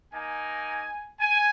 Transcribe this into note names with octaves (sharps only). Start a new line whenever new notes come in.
A#3 D#4 G#5
G#5